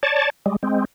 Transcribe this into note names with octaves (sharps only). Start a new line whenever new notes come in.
C#5 D5 A5
G3 G#3
G#3 C4